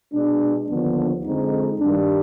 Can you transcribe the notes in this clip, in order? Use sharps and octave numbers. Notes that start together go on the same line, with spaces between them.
B2 G#3 D4
D#2 D3 F3 B3 D4
F2 D3 G#3 C4 D#4
G2 D#3 G3 D4